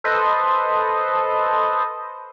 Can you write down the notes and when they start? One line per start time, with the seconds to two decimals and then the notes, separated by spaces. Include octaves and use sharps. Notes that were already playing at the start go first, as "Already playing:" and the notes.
0.04 A4 B4 C5 D#5